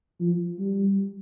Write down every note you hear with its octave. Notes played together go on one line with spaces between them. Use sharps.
F3
G3